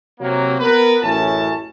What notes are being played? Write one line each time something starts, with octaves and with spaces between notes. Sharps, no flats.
C3 F#3 A#3
B3 A#4 B4
A1 F#2 C#4 E4 A5